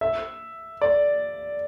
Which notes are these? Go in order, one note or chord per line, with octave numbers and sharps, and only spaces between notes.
E5
D5